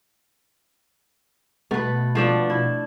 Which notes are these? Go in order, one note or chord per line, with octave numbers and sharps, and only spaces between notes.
B2 A3 B4
F3 A3 D4
E4